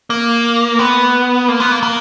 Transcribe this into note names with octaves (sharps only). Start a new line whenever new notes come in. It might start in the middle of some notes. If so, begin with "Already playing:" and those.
A#3
B3
A#3
B3
A#3
A#3